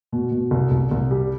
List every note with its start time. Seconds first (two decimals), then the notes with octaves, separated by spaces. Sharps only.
0.12 B2
0.31 B2
0.51 C2
0.71 C2
0.91 C2
1.11 G3